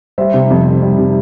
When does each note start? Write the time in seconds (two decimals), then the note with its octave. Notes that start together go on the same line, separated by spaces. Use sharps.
0.18 G3 C5 E5
0.34 C3
0.50 F2
0.66 F2
0.82 G3
0.98 C3